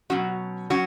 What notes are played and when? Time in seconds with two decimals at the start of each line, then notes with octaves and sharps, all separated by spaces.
0.10 B2 F#3 C#4 F#4
0.70 F#3 C#4 F#4